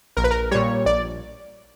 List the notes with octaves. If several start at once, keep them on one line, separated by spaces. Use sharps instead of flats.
A#1 A#4
B4
A#4
A#2 G3 C#5
A#1 D5